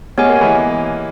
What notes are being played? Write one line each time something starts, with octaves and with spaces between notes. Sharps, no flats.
G#3 B3 G4 C#5 G#5
A#3
E3 G#3